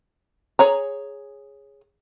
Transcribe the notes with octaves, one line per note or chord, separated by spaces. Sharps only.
G#4 C#5 A#5